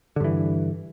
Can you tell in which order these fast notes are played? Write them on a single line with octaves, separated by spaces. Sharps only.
D3 G2 E3